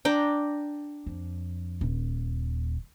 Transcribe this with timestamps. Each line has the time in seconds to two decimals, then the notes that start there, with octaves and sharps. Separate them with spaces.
0.05 D4 G5 A#5
1.07 F2
1.81 D#1